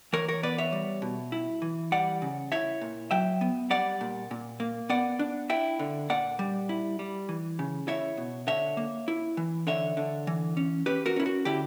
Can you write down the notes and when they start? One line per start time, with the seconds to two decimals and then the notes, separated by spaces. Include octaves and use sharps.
0.13 E3 A#4 C#5
0.28 A#4 C#5
0.43 B3 B4 D5
0.58 C#5 E5
0.73 G3
1.02 B2
1.32 E4
1.62 E3
1.92 G3 D5 F#5
2.22 C#3
2.52 E4 C#5 E5
2.81 A#2
3.11 F#3 E5 G5
3.41 B3
3.70 G3 D5 F#5
4.01 A#2
4.31 A#2
4.60 A#3
4.89 B3 D5 F#5
5.19 D4
5.50 E4 E5 G5
5.79 D3
6.10 A#2 D5 F#5
6.39 G3
6.69 E4
6.99 G3
7.29 E3
7.59 C#3
7.88 E4 C#5 E5
8.17 B2
8.47 D3 C#5 E5
8.77 A#3
9.08 E4
9.37 E3
9.67 D3 C#5 E5
9.97 D3
10.27 E3
10.57 C#4
10.86 C#4 G4 B4
11.06 F#4 A#4
11.16 C#4 E4
11.26 F#4
11.45 D3 E4 G4